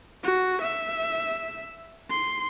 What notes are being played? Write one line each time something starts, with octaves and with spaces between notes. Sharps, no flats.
F#4
E5
C6